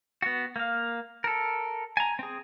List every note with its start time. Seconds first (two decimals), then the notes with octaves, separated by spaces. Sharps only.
0.22 B3 F#4
0.56 A#3 F5
1.24 A4 A#4
1.97 G#5 A#5
2.19 C4 G#4